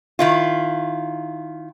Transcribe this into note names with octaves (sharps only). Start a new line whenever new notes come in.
D#3 E4 F4